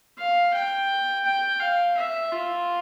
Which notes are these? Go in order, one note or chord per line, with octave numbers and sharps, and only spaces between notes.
F5
G5
G5
F5
E5
F4